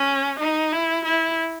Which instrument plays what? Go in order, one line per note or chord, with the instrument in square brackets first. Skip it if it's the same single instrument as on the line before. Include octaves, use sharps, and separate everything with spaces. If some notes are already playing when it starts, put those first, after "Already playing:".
Already playing: [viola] C#4
D#4
E4
E4